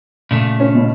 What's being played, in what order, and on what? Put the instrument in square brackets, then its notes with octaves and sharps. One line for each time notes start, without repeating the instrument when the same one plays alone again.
[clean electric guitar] A#2 C#3 A3
[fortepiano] C#4
B2